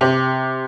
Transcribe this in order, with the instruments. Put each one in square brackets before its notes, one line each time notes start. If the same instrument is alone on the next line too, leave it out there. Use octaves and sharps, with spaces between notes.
[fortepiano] C3